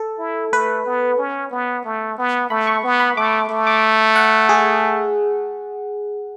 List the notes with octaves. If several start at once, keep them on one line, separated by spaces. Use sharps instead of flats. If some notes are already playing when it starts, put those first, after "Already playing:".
Already playing: A4
E4
A3 B4
B3
C#4
B3
A3
B3
A3 B5
C#6
B3
B5
A3 D6
D6
A3
D6
F#5
G#4